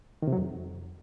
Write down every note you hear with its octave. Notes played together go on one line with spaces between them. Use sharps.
D#3
C3
F#3
F2